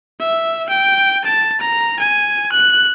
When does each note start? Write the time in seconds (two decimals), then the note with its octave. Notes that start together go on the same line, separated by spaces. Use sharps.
0.20 E5
0.69 G5
1.25 A5
1.61 A#5
1.99 G#5
2.52 F#6